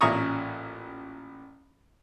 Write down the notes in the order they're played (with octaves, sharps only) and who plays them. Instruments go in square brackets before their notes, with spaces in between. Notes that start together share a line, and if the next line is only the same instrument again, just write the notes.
[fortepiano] A1 A#2 C#4 A#5 C#6 D#6